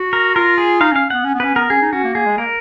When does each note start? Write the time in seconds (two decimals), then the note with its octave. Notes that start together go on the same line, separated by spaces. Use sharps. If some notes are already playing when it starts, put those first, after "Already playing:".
Already playing: F#4
0.13 A#4
0.36 F4 A#4
0.58 G#4
0.81 D#4 F5
0.92 C#4 F5
1.10 B3 F#5
1.24 C#4
1.35 B3
1.40 C#4 B4
1.54 B3 A#4
1.70 C#4 G#4
1.82 D#4
1.93 C#4 F#4
2.04 A#3
2.15 A#3 G#4
2.26 G#3
2.38 A#3 A#4